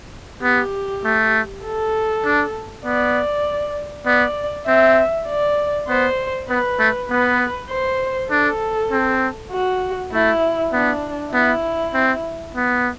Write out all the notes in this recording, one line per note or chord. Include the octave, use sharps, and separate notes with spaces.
B3 G4
A3
A4
D4
B3 D5
B3 D5
C4 E5
D5
B3 C5
B3 B4
A3
B3 B4
C5
D4 A4
C4
F#4
A3 E4
B3 D4
B3 E4
C4
B3